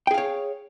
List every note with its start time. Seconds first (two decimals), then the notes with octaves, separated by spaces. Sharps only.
0.07 G5
0.11 G#4
0.14 F5
0.18 C#5